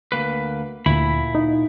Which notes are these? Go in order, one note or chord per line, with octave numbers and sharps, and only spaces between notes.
D2 A#3 B4
D2 A#2 E4 B5
D#4